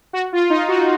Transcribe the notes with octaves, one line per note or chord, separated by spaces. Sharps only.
F#4
F4
D#4
F#4